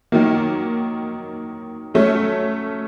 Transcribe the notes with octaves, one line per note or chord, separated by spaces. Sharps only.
D#3 F#3 A#3
F#3 A3 C#4